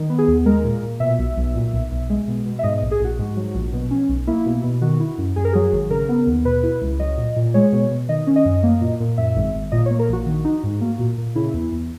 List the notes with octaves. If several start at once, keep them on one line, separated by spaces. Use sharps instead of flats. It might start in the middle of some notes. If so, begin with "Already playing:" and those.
Already playing: D#3
B3
G#4
D#2
G#3 A#4
A#2
A#2
B2 E5
B1
B1
A#2
B1
B1
G#3
B2
B2
E5
G#2 D#5
D#5
A#1
G#4
A#1 F#4
G#2
F#3
A#1
B2
C#4
B1
A#3 E4
B2
B2
D#3 F#4
E4
F#2
F#2 G#4
A#4
F#3 G#4
G#1
C#3 A#4
B3
D#2
B2 B4
E4
C#2
F#3 D#5
A#2
A#2
G#3 C#5
B2
B2
D#3 D#5
C#4
D#5
F#2
A#3
A#2
A#2
F#2 E5
G#1
G#1
A#2 D#5
C#5
A#3
A#4
A#1 F#4
D#3
D#4
G#2
A#3
A#2
A#2
C#3 E4
E2
E2